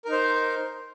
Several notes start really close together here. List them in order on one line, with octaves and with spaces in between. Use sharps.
A#4 D#4 C5